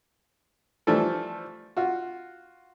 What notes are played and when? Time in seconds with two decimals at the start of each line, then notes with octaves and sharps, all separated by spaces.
0.87 E3 F3 G3 A3 A4
1.77 F4 F#4